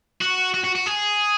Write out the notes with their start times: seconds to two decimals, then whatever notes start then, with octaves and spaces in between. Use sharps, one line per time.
0.21 F#4
0.54 F#4
0.64 F#4
0.76 F#4
0.87 G#4